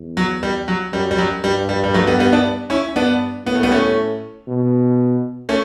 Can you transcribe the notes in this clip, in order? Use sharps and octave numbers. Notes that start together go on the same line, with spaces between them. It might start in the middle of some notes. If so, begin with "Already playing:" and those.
Already playing: E2
F#3
G3
F#3
F#2 G3
G3
F#3
G2 G3
G3
G3
F#3 A3
G3 B3
G3 B3
B3 D4
C#4 E4
G2 B3 D4
A2 B3
A3
G3 B3
A3 C#4
B2
A3 C#4